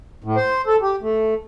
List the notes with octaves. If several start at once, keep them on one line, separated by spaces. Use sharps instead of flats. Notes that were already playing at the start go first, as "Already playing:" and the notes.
A2
C5
A4
G4
A3